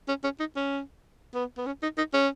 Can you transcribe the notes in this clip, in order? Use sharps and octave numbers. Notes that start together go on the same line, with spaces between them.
C#4
C#4
D#4
C#4
B3
B3
C#4
D#4
D#4
C#4